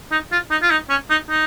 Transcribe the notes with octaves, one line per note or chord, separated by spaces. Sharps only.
D#4
F4
D#4
F4
D#4
C#4
D#4
D#4